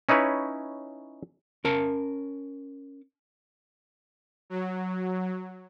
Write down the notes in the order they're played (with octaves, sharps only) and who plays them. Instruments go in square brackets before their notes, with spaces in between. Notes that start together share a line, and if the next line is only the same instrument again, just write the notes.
[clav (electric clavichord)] C#4 D#4 E4 B4 C#5
[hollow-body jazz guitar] C#4 A#4 A5
[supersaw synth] F#3